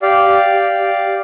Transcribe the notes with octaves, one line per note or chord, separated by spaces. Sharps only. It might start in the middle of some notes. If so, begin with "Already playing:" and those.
G4 D5 F5
G4
G4
G4